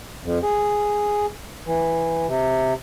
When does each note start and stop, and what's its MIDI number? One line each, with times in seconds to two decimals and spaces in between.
0.24 0.39 41
0.43 1.26 68
1.66 2.26 52
2.27 2.73 48